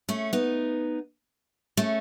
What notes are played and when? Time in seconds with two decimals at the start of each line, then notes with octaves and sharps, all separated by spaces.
0.09 A3 C#4
0.33 B3 D#4
1.77 A3 C#4